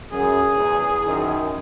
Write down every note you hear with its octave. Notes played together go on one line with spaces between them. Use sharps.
F#2 G#4
E2
F#2 D#3